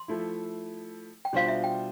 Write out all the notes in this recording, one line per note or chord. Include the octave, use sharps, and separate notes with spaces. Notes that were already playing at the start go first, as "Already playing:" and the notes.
Already playing: C6
F3 A3 E4
G5
B2 G3 D4 F4 C5 F5
E5
G5